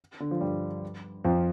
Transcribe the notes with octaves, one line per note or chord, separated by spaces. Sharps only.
D3
F3
G2 G3
F2 F3